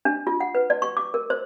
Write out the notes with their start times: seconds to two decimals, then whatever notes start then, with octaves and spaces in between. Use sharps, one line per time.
0.05 D4
0.27 F4
0.40 F#5
0.55 B4
0.70 D5
0.82 C#6
0.97 D6
1.14 A#4
1.30 C5